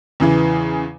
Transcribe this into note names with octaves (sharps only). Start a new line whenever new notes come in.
E2 C#3 E3